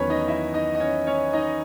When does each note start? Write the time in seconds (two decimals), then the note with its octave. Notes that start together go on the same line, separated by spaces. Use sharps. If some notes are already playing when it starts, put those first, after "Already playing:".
Already playing: E2 D#3 F#3 B3 C#4 B4 C#5
0.10 D#4 D#5
0.28 E4 E5
0.54 D#4 D#5
0.75 D#5
0.80 C#4 C#5
1.07 C#4 C#5
1.33 D#4 D#5